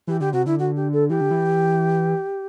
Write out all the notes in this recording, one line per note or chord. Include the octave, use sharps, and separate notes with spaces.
E3 G4
D3 G4
C3 F#4
D3 E4
F#4
G4
A4
E3 G4
D3
E3